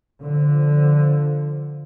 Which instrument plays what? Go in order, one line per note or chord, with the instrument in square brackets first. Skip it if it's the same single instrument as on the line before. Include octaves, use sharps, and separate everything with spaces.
[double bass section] D3 F3